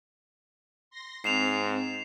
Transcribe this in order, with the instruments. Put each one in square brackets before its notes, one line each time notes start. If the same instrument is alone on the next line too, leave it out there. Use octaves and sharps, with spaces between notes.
[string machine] C6 A#6
[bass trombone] G#2 [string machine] C4 [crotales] C7 E7 F7